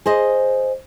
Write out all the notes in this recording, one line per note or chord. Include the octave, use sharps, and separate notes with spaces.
G#4 C5 D#5